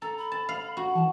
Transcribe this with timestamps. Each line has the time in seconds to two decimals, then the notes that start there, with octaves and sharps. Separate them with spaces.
0.02 A4 A#5
0.17 B5
0.32 A5
0.49 F5
0.77 F#4
0.95 E3 A5